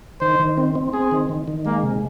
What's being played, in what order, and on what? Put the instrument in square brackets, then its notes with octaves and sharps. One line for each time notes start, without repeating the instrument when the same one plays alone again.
[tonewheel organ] D#3 [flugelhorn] C5
[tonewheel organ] D#3
C4
C4
[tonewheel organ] C4 [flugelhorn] G#4
[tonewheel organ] D#3
D#3
D#3
[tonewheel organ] G#3 [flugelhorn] A#3
[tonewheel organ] C3